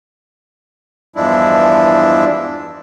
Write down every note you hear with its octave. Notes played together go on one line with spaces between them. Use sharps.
E2 G2 F3 G#3 D4 E4